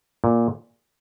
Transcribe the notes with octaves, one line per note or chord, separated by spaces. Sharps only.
A#2